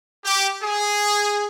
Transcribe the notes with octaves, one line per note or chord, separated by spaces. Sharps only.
G4
G#4